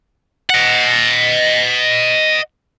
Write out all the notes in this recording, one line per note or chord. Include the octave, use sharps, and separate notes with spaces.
D#5 F#5